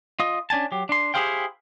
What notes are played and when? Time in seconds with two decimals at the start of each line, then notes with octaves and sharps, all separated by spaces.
0.20 F4 D#5
0.50 C#4 D4 G#5 A5
0.72 F#3 G4
0.89 D4 C6
1.14 E4 G4 G#4 C5 F5 G5